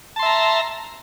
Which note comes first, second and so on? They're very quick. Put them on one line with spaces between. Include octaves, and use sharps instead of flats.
A5 C6 E5 A#5